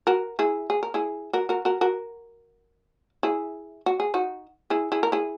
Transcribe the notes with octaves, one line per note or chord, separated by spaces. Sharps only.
F#4 A#4
E4 G#4
G#4
A#4
E4 G#4
F#4 A#4
F#4 A#4
F#4 A#4
F#4 A#4
E4 G#4
F#4
G#4
D#4 F#4
E4 G#4
E4 G#4
A#4
E4 G#4